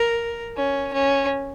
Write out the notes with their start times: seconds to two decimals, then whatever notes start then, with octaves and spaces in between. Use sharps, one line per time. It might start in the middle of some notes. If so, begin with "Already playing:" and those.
Already playing: A#4
0.56 C#4
0.93 C#4